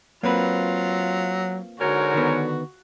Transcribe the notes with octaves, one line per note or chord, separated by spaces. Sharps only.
F#3 A#3 C4 F4 B4
G#2 D3 F#4 A#4 C#5
D#3 B3